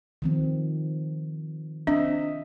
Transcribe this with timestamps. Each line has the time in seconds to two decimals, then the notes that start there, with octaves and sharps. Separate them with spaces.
0.22 D#3 F3 C4
1.87 C4 D4 D#5 E5